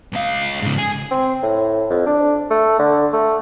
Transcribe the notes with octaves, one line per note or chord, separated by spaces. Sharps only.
C#2 F5
G#2 C#3
G#4
C4
A2
F2
D4
A3
D3
A3